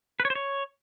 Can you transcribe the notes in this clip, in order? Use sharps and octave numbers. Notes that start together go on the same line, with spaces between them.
B4
C#5
C5
C#5